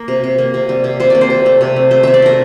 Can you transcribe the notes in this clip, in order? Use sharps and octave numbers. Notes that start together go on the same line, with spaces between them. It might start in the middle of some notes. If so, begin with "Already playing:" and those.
Already playing: A#3 A#4
C3
C3
A#3
C3
G3
C3
C3 C5
A#3 D5
C5
C3
A3
C3
A3
A3 C5
C3 E5
D5
A3 A#4